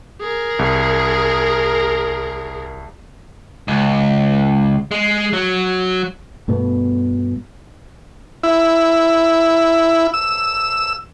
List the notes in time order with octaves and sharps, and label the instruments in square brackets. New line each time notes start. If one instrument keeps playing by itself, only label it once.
[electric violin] G#4 A#4
[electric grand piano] C2
[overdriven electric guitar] C#2
G#3
F#3
[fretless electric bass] G2 B2 A3 B3
[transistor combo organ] E4
E6